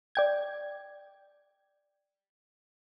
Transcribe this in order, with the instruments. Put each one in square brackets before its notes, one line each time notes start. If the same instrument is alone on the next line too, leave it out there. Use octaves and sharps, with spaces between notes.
[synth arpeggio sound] D5 G5 G#6